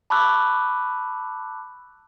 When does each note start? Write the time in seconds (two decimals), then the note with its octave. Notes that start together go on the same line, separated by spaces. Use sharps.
0.10 A5 B5 C#6 D6 E6 F#6